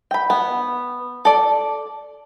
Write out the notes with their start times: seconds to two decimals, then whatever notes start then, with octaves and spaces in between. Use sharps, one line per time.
0.11 G5 B5
0.30 B3
1.25 A4 D5